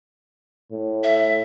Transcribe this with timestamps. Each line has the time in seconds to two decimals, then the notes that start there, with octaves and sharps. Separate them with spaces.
0.72 A2
1.03 E5